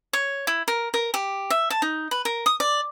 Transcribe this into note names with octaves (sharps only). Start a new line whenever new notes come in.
C#5
E4
A#4
A#4
G4
E5
A5
D#4
B4
A#4
D#6
D5